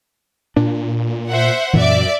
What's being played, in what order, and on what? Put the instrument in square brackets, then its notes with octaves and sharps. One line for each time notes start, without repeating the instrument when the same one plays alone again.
[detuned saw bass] A#2 [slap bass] D4
[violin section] C5 E5 F#5
[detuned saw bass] F#2 [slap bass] A#2 E3 [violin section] D5 E5